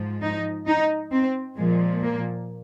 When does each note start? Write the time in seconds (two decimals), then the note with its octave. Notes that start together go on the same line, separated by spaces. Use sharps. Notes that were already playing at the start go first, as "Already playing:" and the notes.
Already playing: G#2 F3
0.22 D#4
0.67 D#4
1.12 C4
1.57 A#2 F3 G#3
2.02 A#3